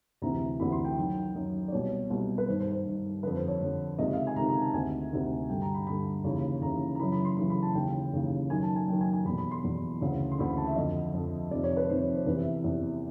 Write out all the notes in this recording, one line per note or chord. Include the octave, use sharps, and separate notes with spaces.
D2 C3 E3 A#5
D2 C3 E3 B5
C6
G5
F#2 D#3
F#2 D#3
D5
C2 B2 C#5
C2 B2
B4
G2 D#3 C5
C5
C5
G2 D#3
F2 D3 B4
C5
C#5
F2 D3
C#2 C3 D#3 D#5
D#5
F5
E5
G#5
C#2 C3 D#3 A#5
A#5
A5
D2 C3 D#3 G#5
D2 C3 D#3
G2 D3 G5
A#5
B5
G2 D3 B5
D#2 C#3 E3
D#2 C#3 E3 A#5
A#5
F#2 C#3 E3 B5
B5
C6
F#2 C#3 E3 B5
B5
A5
D#2 C#3 E3 G5
D#2 C#3 E3
F#2 D#3 G#5
A5
G#5
F#2 D#3 G5
G#5
G#5
E2 B2 B5
B5
C6
E2 B2
D2 C#3 E3
C6
D2 C#3 E3 B5
B5
A5
E5
F2 D3 D#5
F2 D3
F2 C3 D#3 D5
C#5
B4
F2 C3 D#3 C5
C#5
C5
E2 C3 E3 B4
E5
E2 C3 E3